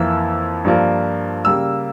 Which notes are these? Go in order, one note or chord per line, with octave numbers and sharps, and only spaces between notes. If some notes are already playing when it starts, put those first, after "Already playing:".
Already playing: F2 E3 A#3 E6
G2 F3 A#3
C#3 G3 A#3 E6